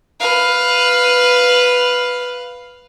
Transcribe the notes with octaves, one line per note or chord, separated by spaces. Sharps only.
B4 F5